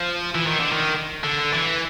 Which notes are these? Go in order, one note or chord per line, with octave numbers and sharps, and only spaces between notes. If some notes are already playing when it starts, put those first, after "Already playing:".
Already playing: F3
E3
D#3
D3
D#3
D3
E3